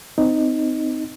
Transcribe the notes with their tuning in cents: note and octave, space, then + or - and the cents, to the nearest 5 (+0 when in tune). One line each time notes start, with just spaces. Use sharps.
C4 -20 D#4 +0